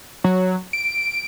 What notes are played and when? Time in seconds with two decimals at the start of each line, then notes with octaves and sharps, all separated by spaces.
0.24 F#3
0.73 D7